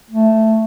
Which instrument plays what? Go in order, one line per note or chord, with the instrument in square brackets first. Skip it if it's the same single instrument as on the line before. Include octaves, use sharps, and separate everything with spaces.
[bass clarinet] A3